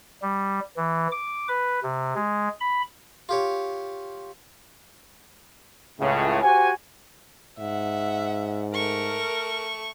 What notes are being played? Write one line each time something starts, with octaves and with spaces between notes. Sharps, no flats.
G3
E3
D6
B4
C3
G#3
B5
F4 G4 C#5
C#2 A2 C#3
F#4 G4 C5 F#5 G#5
G#2 E5 F#5
A3 A#4 C#6